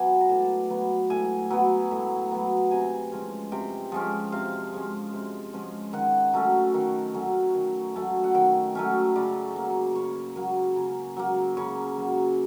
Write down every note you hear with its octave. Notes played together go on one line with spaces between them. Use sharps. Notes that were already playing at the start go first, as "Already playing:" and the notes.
Already playing: F#3 B3 D5 G#5
A#5
A2 A5
F#3 B3
A2 G#5
F#3 B3
A2
F#3 B3
C3 G#5
F3 G#3 C#4
C3 G5
F3 G#3 C#4
C3 F5
F3 G#3 C#4
C3
F3 G#3 C#4
D#3 F#5
F#3 A3 C#4
D#3
F#3 A3 C#4
D#3
F#3 A3 C#4
F#5
D#3 G5
F#3 A3 C#4
C#3 D5
F#3 A#3
C#3 C#5
F#3 A#3
C#3
F#3 A#3
C#3 C#5
F#3 A#3